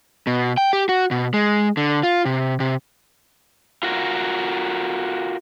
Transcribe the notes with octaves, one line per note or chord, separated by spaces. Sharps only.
B2
G5
G4
F#4
B2
G#3
D3
F4
C3
C3
F4 F#4 A#4